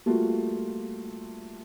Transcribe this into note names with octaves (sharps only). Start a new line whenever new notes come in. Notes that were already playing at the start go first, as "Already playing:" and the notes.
G3 A3 A#3 F4 F#4